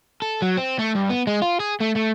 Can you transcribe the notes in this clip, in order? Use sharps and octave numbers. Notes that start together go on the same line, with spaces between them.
A4
F#3
C4
A3
G2
B3
G#3
F4
G#4
A3
A3